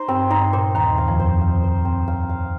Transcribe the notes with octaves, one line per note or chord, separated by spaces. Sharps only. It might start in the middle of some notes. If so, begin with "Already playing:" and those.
Already playing: D#4 C5
G2 C4
G2 D#4
A#2 C5
D#2 D#3 D#4
F5
F2 F3
C5
F5
C5
C4
F5
F5